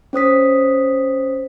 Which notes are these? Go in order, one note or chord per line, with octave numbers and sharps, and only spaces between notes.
C#4 C5 D#6 B6